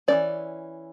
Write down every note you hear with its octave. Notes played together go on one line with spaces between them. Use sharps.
E3 A3 C#4 D5